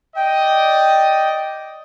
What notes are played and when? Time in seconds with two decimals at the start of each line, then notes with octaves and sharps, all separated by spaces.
0.16 D5 D#5 G5